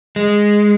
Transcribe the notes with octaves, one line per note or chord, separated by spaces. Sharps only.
G#3